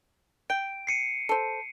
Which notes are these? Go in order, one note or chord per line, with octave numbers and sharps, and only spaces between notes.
G5 D7
C7 C#7 D#7
A4 C5